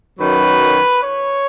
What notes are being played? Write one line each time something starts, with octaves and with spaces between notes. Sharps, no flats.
F#2 D#3 F#3 B4
C#5